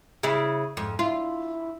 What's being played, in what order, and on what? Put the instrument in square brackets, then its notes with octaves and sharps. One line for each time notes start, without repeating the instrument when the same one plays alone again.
[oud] C#3 E4
[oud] F2 [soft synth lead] G#2
[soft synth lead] E4 [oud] F4